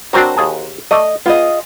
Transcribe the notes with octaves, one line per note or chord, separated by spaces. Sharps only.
F#3 C4 D4 F#4 A#4 C5
D#2 G#4 A5
A3 D5 D#5
B3 F4 G#4 D#5